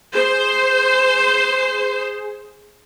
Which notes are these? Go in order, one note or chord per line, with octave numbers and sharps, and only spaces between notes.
G#4 C5